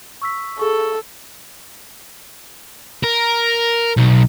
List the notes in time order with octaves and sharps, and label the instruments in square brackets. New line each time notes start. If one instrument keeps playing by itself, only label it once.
[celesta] C#6 E6 B6
[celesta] G#4 C#6 [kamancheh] A4
[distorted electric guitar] A#4
B1